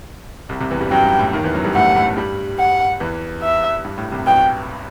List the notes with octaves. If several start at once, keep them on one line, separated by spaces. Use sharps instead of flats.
C2 C3
C2 C3
E2 E3
G2 G3
F#2 F#3 G5
G2
A2
D#2 D#3
E2 E3
F#2 F#3
G2 G3
A2 A3 F#5
A2 A3
G2 G3
F#5
E2 E3
E5
G2
A2
C2 C3
B1 B2 G5